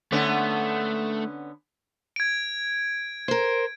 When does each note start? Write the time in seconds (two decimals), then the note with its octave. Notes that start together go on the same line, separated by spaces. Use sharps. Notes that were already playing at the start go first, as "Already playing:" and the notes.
0.12 D3 A3 B3 C#4
2.16 G#6 D7
3.28 A#4 C5